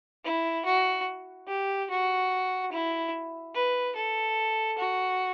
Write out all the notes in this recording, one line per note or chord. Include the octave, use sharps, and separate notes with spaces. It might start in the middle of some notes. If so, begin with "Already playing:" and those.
E4
F#4
G4
F#4
E4
B4
A4
F#4